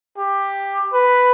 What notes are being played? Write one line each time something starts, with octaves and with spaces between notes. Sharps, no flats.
G4
B4